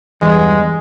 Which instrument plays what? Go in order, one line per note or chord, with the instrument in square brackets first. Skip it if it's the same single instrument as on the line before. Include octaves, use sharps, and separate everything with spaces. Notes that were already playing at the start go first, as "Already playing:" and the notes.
[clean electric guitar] E2 G2 [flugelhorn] G#3